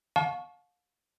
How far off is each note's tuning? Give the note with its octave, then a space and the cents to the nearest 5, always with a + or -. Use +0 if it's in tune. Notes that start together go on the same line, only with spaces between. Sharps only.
F5 +40 A5 -30 C#6 +0